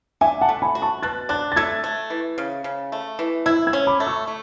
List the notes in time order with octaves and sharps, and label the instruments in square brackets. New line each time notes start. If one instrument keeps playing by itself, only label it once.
[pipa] D4 [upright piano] E5 G#5
[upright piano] F#5 A5
[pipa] A3
[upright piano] G#5 B5
[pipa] F#4
[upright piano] A5 C#6
[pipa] B2 [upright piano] F#6 A6
[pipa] D4 [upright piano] F#6 A6
[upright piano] A6
[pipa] A3 [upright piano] E6 G#6
[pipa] A3
E3
C#3
C#3
A3
E3
[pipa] E4 [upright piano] E6 G#6
[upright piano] E6 G#6
[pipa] C#4
[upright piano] B5 D6
[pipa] A3
[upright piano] C#6 E6
[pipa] A3